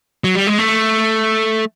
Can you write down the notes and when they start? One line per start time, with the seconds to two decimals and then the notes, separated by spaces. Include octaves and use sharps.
0.24 F#3
0.35 G3
0.47 G#3
0.58 A3